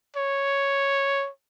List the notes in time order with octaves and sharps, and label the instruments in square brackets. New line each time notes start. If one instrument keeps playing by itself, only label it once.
[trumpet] C#5